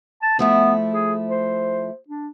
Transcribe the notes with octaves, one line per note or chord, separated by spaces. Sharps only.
A5
F3 A3 B3 E4
G#4
C5
D4